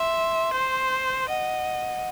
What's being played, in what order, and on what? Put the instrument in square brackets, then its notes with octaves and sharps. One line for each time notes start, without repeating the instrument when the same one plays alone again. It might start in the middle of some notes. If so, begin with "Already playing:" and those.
Already playing: [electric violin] E5 [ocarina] C6
[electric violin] C5
[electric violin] D#5 [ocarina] F#5